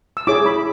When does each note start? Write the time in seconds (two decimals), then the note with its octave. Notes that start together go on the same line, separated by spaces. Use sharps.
0.17 E6
0.27 E4 G#4 C#5 D6
0.46 B5